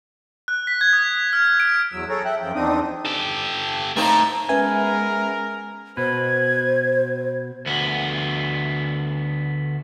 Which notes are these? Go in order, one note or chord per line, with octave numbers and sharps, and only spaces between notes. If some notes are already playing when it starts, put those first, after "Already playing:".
F#6
B6
G#6
D#6
F6
D7
E2 F#3 E6
G#4 A4 C#5 A#5
E5 G5 F#6
F#2 F3 G5
E2 C4 D4 D#4 D#6
G4 A4
A2 A3 A#3 C4 D#4
G#3 B3 C#4 G#4 A#4 B4 E5 G#5
B2 B4 C5 G#6
D2 B3